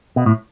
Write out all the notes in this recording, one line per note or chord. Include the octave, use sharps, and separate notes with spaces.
B2
A2